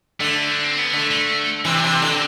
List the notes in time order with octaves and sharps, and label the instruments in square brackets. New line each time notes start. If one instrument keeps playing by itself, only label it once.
[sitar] D3 [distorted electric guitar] A3
[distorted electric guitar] D4
C4
B3
[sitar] D3 [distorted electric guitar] A3
[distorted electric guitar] A3
[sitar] C3 E3 [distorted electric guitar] C4
[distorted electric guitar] D4
[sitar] C3 E3
[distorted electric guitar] C4
[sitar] D3